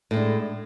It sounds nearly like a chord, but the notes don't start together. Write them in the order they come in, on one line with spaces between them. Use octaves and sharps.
A2 G#3 D4